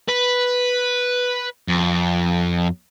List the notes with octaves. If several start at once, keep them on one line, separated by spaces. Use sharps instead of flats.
B4
F2